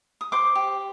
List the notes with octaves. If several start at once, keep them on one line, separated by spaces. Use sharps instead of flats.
D#6
C5 C6 D6
G4